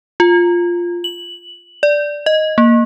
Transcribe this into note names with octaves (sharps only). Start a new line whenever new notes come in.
F4
F#7
D5
D#5
A#3